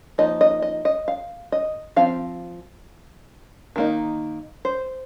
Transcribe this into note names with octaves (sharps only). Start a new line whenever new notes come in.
F3 A#3 D#4 D#5
D#5
D#5
D#5
F5
D#5
F3 C4 F5
D#3 A#3 D#4
C5